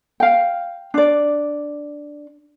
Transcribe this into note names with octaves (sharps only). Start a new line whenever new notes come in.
F5 G5
D4 D5